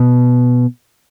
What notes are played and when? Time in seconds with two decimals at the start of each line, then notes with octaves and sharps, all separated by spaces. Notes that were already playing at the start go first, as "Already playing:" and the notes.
Already playing: B2